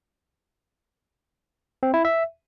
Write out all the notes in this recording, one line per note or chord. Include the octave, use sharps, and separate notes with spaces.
C4
E4
E5